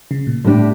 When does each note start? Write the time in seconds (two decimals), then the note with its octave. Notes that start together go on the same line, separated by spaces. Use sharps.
0.11 C#3
0.27 A#2
0.44 A2 G3 D4 G4